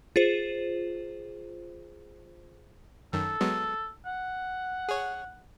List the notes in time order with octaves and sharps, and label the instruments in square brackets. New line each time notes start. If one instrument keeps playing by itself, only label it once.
[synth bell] F4 G#4 C5
[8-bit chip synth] F#2 D#3 [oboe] A4
[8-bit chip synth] F#3 G#3 B3
[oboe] F#5
[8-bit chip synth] G#4 C#5